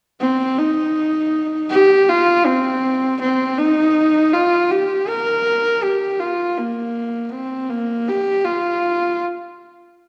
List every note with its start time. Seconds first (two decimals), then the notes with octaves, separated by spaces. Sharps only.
0.21 C4
0.59 D#4
1.70 G4
2.09 F4
2.45 C4
3.21 C4
3.58 D#4
4.33 F4
4.70 G4
5.08 A#4
5.83 G4
6.20 F4
6.58 A#3
7.33 C4
7.70 A#3
8.08 G4
8.44 F4